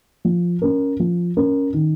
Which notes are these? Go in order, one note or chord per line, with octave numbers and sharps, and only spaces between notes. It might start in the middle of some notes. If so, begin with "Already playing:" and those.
F3
C#4 A#4
F3
C#4 A#4
D#3